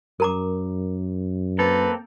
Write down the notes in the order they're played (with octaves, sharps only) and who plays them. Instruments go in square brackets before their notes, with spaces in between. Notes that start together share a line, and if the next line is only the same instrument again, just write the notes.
[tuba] F#2 [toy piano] A#4 A#5 D6
[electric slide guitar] A#3 C4 A4 [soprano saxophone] B4